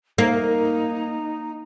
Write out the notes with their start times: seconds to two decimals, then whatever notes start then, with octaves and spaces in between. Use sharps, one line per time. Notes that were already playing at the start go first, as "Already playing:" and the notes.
0.18 A#3 D#4